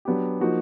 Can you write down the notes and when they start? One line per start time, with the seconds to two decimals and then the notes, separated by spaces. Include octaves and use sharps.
0.05 F#3 B3 D4 G4
0.41 F3 A#3 D#4 F#4